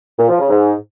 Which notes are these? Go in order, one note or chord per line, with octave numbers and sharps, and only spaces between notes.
A#2
F3
C#3
G#2